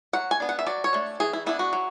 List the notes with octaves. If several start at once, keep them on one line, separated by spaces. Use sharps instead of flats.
F#3 F#5
G#5
B3 D4
F#5
E5
F#3 D5
C#5
A3 D4
E3 G#4
E4
B3 D4 E4
F#4
F#3